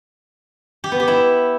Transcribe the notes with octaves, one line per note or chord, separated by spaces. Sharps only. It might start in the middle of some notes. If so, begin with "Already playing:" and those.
G4
B3
G4
E4